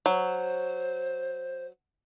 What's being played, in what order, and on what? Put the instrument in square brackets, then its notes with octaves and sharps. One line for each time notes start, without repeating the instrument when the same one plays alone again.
[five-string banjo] F#3 [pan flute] C5